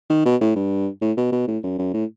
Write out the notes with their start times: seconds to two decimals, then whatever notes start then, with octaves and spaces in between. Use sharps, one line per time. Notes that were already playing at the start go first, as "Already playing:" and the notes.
0.10 D#3
0.25 B2
0.41 A2
0.56 G2
1.02 A2
1.18 B2
1.32 B2
1.48 A2
1.63 F#2
1.78 F#2
1.94 A2